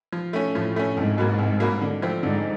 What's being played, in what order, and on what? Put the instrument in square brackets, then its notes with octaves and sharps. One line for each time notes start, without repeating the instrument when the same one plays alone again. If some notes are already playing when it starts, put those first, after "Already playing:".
[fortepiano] F3
A3 C#4
[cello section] A2 [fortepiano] F3
[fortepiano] A3 C#4
[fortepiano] C2 [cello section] G#2
[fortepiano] B2 F#3 A#3
C2
B2 F#3 A#3
D3
F3 A3 C4
[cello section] G#2 [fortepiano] D3